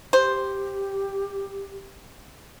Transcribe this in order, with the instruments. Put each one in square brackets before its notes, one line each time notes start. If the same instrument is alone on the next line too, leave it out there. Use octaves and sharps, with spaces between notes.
[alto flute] G4 [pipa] C5